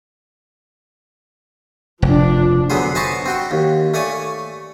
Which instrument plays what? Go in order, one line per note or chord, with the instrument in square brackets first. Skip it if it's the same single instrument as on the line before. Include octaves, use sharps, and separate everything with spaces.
[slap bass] F1 [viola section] F3 D4
[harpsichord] D3 F#3 B3 G#4 C5
C5 D#5 G#5 A5 B5 C#6
C4 F#4 G5
D#2
A3 C#5 D5 G#5